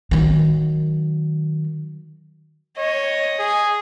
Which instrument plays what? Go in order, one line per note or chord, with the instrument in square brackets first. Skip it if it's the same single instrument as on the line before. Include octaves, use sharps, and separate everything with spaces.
[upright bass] D#3 F#3
[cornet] C#5 [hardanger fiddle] D#5
[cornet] G#4